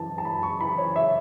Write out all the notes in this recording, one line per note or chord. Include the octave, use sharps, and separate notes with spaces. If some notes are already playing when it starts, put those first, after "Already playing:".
Already playing: F#2 E3 A5
A5
F#2 B5
C#6
E3 B5
C#5
E5